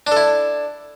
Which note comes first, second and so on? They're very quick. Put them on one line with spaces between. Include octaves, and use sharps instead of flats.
D4 A4 E4